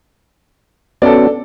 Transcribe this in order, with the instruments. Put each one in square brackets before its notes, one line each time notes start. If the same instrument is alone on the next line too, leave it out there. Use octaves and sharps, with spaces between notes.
[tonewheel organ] B3 C#4 F#4 [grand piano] A4 D5